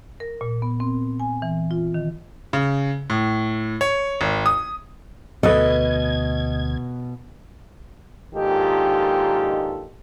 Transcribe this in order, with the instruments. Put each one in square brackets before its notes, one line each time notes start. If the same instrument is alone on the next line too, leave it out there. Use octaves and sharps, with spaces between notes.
[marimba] A#4
A#2
B3
C4
G#5
E3
F4
D#3
[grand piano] C#3
A2
C#5
G#1
D#6
[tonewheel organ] D2 G#6 [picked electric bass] B2 [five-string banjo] A4 B4 [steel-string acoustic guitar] D#5
[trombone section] A#1 G#2 D#3 F4 G4 A4